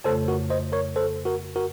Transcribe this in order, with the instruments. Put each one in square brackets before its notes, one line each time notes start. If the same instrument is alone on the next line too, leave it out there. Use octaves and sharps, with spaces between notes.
[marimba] F2 C#3 A3 [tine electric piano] A4 C5
[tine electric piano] F#4 A#4
C5 D#5
A#4 C#5
A4 C5
F#4 A#4
F#4 A#4